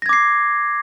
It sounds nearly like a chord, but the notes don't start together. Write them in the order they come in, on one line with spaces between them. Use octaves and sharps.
A#6 G#6 D6 C7